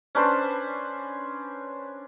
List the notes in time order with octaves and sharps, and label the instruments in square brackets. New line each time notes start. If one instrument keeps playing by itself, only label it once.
[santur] C#4 D4 B4 C5